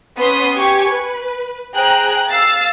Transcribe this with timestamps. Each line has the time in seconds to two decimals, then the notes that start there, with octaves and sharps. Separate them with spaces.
0.18 B3 C#4 B4 C6 D#6 B6
0.57 G4 G#5 C#6 G#6
0.89 B4
1.74 G#4 C5 G5 A#5 F#6
2.30 F5 E6 A6 C7